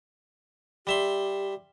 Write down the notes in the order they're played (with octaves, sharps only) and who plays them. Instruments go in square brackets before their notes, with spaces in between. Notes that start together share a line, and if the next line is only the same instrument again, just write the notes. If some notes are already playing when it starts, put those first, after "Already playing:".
[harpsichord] G3 E5 C6 [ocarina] G4